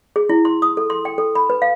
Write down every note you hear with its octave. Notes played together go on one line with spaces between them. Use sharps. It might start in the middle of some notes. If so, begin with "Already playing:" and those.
G#4
E4
C6
D#6
A4
C6
G5
A4
B5
B4
F5